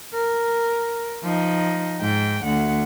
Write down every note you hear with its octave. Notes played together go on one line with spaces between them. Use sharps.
A#4
F3 D#4
G#2 G5
D2 F#5